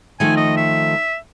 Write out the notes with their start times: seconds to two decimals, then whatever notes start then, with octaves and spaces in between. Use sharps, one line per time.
0.20 D#3 F3 A3 G#5
0.37 D#5
0.57 E5